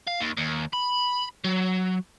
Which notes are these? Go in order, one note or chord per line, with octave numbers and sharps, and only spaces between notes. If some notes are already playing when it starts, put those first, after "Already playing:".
F5
D#2
D#2
B5
F#3